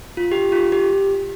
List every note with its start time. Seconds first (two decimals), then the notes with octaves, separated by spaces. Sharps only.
0.17 F4
0.32 G4
0.52 F4
0.72 G4